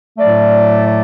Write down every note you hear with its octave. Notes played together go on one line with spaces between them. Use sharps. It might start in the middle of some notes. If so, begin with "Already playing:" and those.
A2 F#3 A3 D5
D5